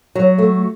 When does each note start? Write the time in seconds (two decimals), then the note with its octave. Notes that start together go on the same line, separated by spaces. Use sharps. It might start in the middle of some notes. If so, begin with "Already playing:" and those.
0.15 F#3
0.38 A3